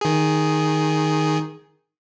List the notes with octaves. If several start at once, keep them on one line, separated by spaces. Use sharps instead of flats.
D#3 G#4